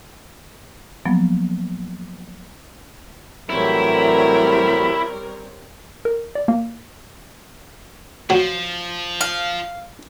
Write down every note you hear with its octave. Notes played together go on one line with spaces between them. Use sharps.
F3 F#3 A#3 B3
A2 E3 F#3 G3 C4 E4 A#4 C#5
A#4
D5
A#3
F3 F#3 F#4
F5